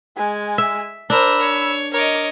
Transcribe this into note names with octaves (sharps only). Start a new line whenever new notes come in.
G#3 G#5
E5
D4 A#4 C5 B5 E6
C#5
A#4 C#5 D#5 D6